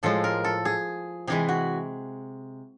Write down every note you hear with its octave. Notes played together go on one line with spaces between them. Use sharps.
A2 F3 G#3 A4
A#4
A4
G#4
C3 E3 G#3 G#4
F#4